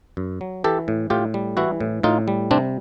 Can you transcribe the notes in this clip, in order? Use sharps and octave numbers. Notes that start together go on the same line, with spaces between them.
F#2
F#3
E3 G4 A4
A2
A2 F4 G4
G3
E3 E4 F#4
A2
A2 D#4 F4
G3
C3 C4 D4